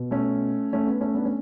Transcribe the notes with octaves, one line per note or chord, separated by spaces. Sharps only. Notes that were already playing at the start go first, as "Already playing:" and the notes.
Already playing: B2
A3 C#4
A3 C#4
B3
A3 C#4
B3 D4
A3 C#4